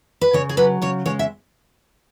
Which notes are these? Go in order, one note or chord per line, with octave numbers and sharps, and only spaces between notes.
B4
C#3 C#5
G#4
F#3 B4
C#3 C#5
G#3 C#5
E5